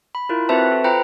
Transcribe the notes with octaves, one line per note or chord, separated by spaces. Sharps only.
B5
E4 F4 A#4
C4 F#4 B4 C5 E5 A5
A4
F4 B4 C5 G5 A#5 B5